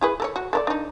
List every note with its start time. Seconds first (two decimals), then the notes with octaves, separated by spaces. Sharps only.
0.01 E4 G#4 B4
0.20 A4 A#4 C#5
0.36 F#4
0.53 A4 A#4 D5
0.67 D4 D#4